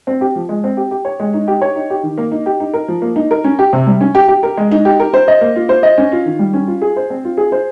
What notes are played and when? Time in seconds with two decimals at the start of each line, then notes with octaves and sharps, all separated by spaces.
0.07 C4
0.21 G4
0.36 F3
0.49 G#3
0.64 C4
0.77 G4
0.91 G4
1.05 C#5
1.20 G#3
1.34 D#4
1.48 G4
1.61 C#5
1.76 D#4
1.90 G4
2.03 D#3
2.18 A#3
2.31 D#4
2.46 G4
2.60 D#4
2.74 A#4
2.88 F3
3.02 A#3
3.16 D#4
3.31 A#4
3.44 C#4
3.59 G4
3.73 C3
3.87 G3
4.01 C#4
4.15 G4
4.28 G4
4.43 A#4
4.57 G#3
4.71 D#4
4.85 G4
5.00 A#4
5.14 C5
5.28 D#5
5.41 A#3
5.56 F4
5.69 C5
5.83 D#5
5.98 C#4
6.12 F4
6.26 D#3
6.39 G3
6.54 C#4
6.67 F4
6.82 G#4
6.96 C5
7.10 C4
7.24 F4
7.37 G#4
7.52 C5